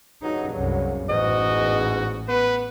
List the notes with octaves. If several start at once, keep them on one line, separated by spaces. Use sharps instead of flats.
G2 C#3 F#3 D#4
C2 F#2
A1 E2 G#2 F#4 D#5
B3 B4